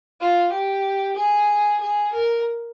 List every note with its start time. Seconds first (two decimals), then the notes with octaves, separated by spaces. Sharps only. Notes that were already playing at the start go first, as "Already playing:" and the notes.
0.20 F4
0.52 G4
1.16 G#4
1.80 G#4
2.12 A#4